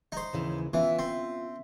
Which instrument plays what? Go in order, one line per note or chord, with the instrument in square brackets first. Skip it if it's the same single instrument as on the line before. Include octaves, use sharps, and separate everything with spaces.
[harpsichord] D#4 C5
[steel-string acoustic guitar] D#2 C#3 E3
[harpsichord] E3 [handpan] B3 C#4 E5 [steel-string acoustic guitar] F4
[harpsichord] C4